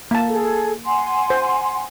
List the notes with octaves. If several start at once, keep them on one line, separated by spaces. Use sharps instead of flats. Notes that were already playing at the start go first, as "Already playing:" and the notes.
A#3 A5
G#4 A4
F#5 G#5 C6
C5